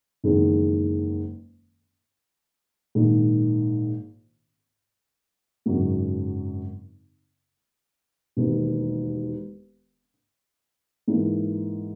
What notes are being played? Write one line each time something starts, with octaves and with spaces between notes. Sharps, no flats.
F#1 E2 D#3 G#3
A#1 G#2 D#3
G#1 F#2 C#3 F#3
E1 D#2 D#3
G#2 E3 A#3